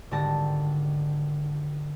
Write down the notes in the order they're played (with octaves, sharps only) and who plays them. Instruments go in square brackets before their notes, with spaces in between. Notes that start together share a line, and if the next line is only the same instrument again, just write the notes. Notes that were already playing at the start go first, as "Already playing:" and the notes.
[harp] G#1 D3 G4 A5 A#6